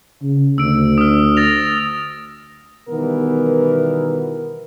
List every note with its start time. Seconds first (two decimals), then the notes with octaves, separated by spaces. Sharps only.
0.22 C#3
0.58 D2 E6 D7
0.98 D#6 F6
1.37 A6 A#6 F7
2.89 B2 D#3 E3 G3 B3 A#4